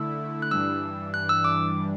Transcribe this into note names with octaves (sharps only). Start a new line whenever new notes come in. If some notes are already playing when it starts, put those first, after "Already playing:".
Already playing: D3 A3 E4 E6
F#6
G2 E3 G3 D4 E6
F#6
E6
D6